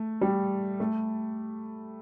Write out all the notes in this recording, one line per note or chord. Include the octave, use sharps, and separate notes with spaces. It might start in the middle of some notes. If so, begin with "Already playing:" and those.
Already playing: A3
G3
A3